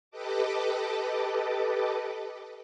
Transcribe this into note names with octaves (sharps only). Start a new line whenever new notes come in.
G4 A4 B4 D#5 A5 D6